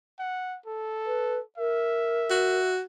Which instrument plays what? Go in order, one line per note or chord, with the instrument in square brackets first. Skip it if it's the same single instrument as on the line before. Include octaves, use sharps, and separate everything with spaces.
[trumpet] F#5
A4
[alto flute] B4
[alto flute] A#4 [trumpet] E5
[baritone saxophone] F#4